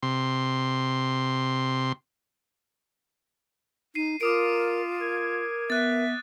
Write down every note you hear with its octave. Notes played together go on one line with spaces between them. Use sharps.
C3 C6
D#4 C7 D#7
F4 A#4 D6 D#6 D7
A#4 G#6
B3 E5 F#6 A6